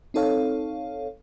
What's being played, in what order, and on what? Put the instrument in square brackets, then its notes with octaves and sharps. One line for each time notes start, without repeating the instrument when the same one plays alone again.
[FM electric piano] C4 D#4 A4 C#5 F5